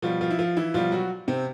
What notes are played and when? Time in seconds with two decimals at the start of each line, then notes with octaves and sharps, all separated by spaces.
0.02 B2 F3 G3 F4
0.21 F3 F4
0.30 E4
0.39 F3 F4
0.57 E3 E4
0.74 B2 F3 G3 F4
0.92 F#3 F#4
1.28 C3 C4